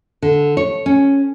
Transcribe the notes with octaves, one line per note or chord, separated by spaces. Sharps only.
D3
C#5
C#4